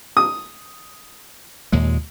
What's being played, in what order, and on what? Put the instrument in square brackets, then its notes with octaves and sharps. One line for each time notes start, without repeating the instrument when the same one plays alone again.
[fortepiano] D#6
[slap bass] D#2 A#2 G#3